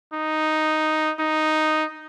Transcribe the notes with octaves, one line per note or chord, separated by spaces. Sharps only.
D#4
D#4